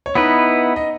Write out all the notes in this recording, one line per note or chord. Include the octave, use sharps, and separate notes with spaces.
C#5
B3 D#4 E4 B4 D#5
D#5